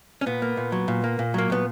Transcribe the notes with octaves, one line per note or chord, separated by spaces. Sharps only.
C#4
A#2 B3
A#3
A#2
F#3
A#2
A#3
A#2
F#3 A#3
A#2 B3